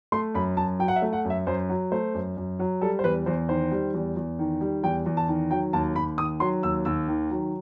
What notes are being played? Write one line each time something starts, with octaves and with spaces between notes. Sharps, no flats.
A3 C6
F#2 B5
F#2 A5
F#3 G5
F#5
E5
A3
F#5
F#2
E5
F#2 C5
F#3
A3 C5
F#2
F#2
F#3
G3 A4
C5
E2 B4
E2 C5
D#3 C5
G3
E2
E2
D#3
G3
E2 G5
E2
A5
D#3
F#3 G5
D#2 A5
D#2 B5
D#3 D#6
F#3 C6
D#2 E6
D#2 E6
D#3
F#3